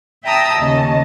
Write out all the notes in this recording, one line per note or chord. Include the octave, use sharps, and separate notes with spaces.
E5 G5 A5 A#5 D#6 E6
D#2 C#3 D#5 A5